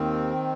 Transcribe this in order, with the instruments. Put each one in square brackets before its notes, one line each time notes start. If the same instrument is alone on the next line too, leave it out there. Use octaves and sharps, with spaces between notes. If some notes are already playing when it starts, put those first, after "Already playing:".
Already playing: [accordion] D#2 D#3 C4